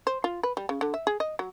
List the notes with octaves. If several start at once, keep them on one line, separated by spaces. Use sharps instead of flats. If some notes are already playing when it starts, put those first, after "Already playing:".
C5
F4
B4
G3
C#3
D3
E5
G#4
D#5
F#3